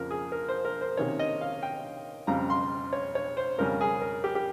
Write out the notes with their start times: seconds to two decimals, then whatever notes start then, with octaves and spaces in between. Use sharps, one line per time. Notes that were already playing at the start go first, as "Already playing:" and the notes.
Already playing: F2 C#3 F3 A#3 A#4
0.11 G#4
0.32 A#4
0.49 C5
0.65 A#4
0.81 C5
0.97 C3 D#3 A#3 C#4 C#5
1.19 D#5
1.41 F5
1.63 G5
2.27 F2 C#3 G3 C4 A#5
2.50 C6
2.93 C#5
3.15 C#5
3.37 C5
3.58 F2 C#3 G3 C#4 A#4
3.81 G#4
4.01 A#4
4.24 G4
4.35 G4